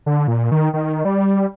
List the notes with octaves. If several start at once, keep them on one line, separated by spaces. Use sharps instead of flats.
D3
A#2
D#3
D#3
G3